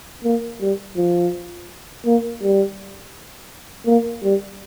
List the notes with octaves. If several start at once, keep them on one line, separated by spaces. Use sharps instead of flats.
A#3
G3
F3
A#3
G3
A#3
G3